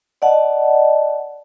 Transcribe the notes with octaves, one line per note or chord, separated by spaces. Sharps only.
D5 D#5 F#5 A5